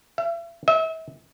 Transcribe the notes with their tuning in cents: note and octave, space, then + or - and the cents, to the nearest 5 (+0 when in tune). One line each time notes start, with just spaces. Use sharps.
E5 +40
E5 -40